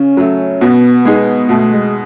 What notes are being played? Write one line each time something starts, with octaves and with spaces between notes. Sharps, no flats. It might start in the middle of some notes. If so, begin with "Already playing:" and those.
Already playing: C#3 C#4
F#3 A3
B2 B3
G#3 D#4 G#4
B2 A3
G#3